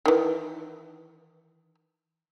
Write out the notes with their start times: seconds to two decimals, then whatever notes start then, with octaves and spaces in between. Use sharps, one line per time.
0.06 D#3 E3